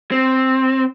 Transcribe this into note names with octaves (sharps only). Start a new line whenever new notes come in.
C4